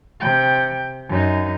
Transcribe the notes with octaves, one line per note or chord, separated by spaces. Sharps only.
C3 G5
F#2 D#4